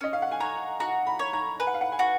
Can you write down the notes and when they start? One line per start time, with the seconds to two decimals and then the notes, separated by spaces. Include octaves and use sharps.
0.01 C#4 D#5
0.13 F5
0.22 F#5
0.31 G#5
0.40 C#5 A#5
0.80 F#4 A#5
1.07 B5
1.19 C#5
1.33 A#5
1.60 B4 G#5
1.67 F#5
1.74 F5
1.81 F#5
1.92 G#5
1.99 F#4 F#5